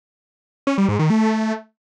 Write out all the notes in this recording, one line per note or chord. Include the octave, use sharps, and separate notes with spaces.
C#4
G3
G#2
D#3
A3